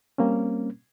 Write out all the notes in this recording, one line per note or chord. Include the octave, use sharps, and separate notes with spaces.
G3 A#3 C4 C#4